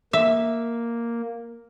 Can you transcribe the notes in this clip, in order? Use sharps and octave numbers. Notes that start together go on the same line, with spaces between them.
A#3 E5